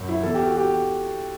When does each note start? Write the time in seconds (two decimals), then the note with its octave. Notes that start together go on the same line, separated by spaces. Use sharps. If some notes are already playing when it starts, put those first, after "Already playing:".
Already playing: F#2
0.08 E4
0.23 E2 A4
0.34 G4
0.45 F#4
0.57 G4